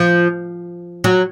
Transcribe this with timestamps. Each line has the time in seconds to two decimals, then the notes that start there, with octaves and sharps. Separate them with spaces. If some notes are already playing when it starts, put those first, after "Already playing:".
Already playing: F3
1.04 F#3